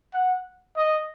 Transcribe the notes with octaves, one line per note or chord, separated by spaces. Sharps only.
F#5
D#5